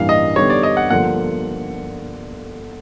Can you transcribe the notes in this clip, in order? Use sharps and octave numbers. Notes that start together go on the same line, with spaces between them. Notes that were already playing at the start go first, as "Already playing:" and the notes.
Already playing: A1 G2 E3 G3 A#3 F5
D#5
D3 G3 B3 D#4 G4 C#5
D5
D#5
F#5
G1 G2 D3 F3 A#3 F#5